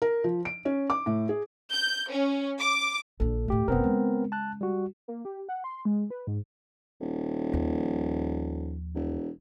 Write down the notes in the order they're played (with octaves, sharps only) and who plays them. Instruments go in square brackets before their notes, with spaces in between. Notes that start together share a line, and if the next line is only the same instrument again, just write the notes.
[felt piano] A#4
F3
D7
C#4
D6
A2
G#4
[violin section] G6
C#4
D6
[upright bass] A#1 D3 [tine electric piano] A4
[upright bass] D2 A2 [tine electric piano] A3 G4
[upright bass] F#1 C3 [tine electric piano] B3 C4 A#4
[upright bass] C#3 G#3
[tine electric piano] A5 F#6
G3 F#4
[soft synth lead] A#3
G4
F#5
C6
G#3
B4
G#2
[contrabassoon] D#1
[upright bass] D#2 F3
[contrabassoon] E1